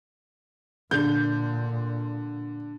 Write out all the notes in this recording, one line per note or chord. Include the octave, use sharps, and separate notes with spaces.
A#2 D3 G6